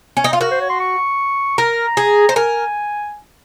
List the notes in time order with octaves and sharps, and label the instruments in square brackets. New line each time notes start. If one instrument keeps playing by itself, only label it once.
[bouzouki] C#4
D#4
F4
[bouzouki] F#4 [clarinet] A#4
[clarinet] C5
C#5
C6
C#6
[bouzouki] A#4 [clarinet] A#5
[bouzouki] G#4
C5
[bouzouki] A#4 [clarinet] G#5